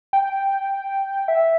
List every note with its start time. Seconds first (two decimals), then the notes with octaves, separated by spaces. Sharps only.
0.13 G5
1.28 E5